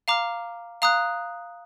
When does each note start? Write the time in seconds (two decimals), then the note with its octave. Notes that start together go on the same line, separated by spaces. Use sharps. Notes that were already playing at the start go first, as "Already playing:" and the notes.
0.08 F5 A#5 D6 F6
0.82 F5 A#5 D#6 F#6